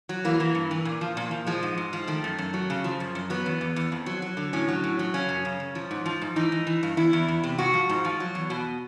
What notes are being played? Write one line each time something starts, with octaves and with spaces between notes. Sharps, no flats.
F#3
E3 A#3
E3
G2
E3
A#2
F3
A#2
F3
F3 G#3
G#2
G#2
F3
D#3 A3
F#2
F#2
F#3
C#3
F3
F#2
F#2
F#3 B3
E2
E2
E2
F2
F#3
F#3
D3
A2 C#4
F#3
A2
F#3
C#3 C#4
F#2
C#3
F#2
F3
G#2
F3
G#2
E3 D#4
E3
E3
G2
E2 E4
E2
E2
C3
G#2 F#4
F3
G#2
F3
F#3
E2
B2